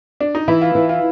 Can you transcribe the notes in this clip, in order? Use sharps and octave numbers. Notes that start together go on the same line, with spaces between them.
D4
D#4
E3 E4
F4
E3
F4